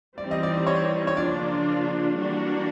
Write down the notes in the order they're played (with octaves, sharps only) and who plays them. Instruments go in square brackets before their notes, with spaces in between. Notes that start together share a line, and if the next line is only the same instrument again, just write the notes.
[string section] E3 G3 C4 D#4 [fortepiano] D5
[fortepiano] D#5
D5
C#5
C#5
[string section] C#3 F3 A#3 D4 F4 [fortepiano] D5
[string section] E3 G3 A#3 D4 F#4